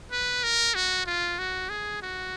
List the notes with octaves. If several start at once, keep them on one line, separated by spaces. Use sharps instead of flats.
B4
A#4
F#4
F4
F#4
G#4
F#4